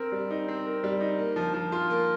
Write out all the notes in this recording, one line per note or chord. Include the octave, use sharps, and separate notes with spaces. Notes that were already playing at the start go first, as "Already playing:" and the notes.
Already playing: C4 A#4
G3
D#4
C4
A#4
G3
D#4
A#3
F3
F3
F4
A#3